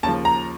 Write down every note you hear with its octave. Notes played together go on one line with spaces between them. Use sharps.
D#2 C#3 F3 A5
A#5